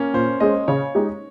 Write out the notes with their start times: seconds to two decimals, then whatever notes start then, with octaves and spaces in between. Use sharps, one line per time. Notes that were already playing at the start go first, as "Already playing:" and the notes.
Already playing: A#3 C#4
0.13 A#2 C5
0.40 G#3 C#4 G#4 C5 D#5
0.68 C#3 C#5
0.95 G#3 D#4 G4